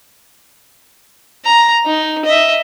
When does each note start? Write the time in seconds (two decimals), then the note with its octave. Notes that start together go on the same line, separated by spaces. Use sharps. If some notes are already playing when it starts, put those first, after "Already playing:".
1.45 A#5
1.86 D#4
2.25 D#5 E5